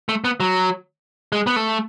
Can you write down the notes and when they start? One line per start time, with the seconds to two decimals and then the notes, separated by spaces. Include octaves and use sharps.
0.09 A3
0.24 B3
0.40 F#3
1.32 G#3
1.47 B3
1.56 A3